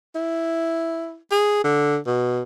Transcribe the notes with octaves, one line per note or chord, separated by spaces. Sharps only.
E4
G#4
D3
B2